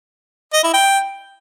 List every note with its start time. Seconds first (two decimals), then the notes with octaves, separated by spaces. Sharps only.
0.53 D#5
0.64 E4
0.74 G5